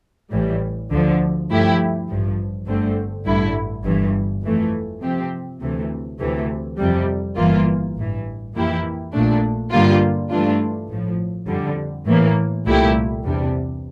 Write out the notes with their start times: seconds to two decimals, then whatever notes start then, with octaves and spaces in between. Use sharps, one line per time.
0.31 A1 A2 E3 G3
0.90 D2 D3 F3
1.50 G2 F3 A3 E4 G4
2.09 A1 G2 F3
2.66 G1 G2 D3 A3 C4
3.25 A1 G2 D3 A3 E4
3.84 G1 G2 E3
4.42 F2 E3 A3
5.02 C3 F3 C4 G4
5.61 D2 C3 E3 A3
6.19 D2 C3 E3 A3
6.78 F2 C3 G3
7.37 G1 G2 E3 A#3 F4
7.96 A1 G2 E3
8.54 F2 E3 A#3 E4 G4
9.13 A#1 A#2 A3 D4
9.71 G2 D3 G3 A#3 F4
10.30 G2 E3 A3 D4 F4
10.89 A1 A2 F3
11.47 F2 D3 G3
12.06 A2 E3 A#3
12.66 C2 A#2 A3 E4 G4
13.23 E2 C3 G3 D4